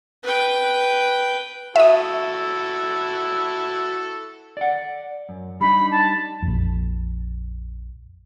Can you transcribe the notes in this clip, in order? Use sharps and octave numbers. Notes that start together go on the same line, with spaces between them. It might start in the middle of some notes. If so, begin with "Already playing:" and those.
B4 G5
E4 F#4 A4 E5 D#6
D5 F#5
F#2
G3 D4 D#4 B5
A5
A#1 F2